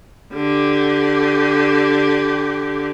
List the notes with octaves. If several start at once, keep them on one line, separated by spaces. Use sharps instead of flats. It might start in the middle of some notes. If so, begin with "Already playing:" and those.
D3 G4